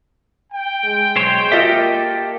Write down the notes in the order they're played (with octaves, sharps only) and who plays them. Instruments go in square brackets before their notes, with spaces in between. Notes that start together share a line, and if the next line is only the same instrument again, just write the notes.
[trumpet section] G5
[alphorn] G#3
[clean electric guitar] B1 C5 C#5
[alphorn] A#3 [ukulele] F4 D#5 E5 [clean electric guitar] G4 A4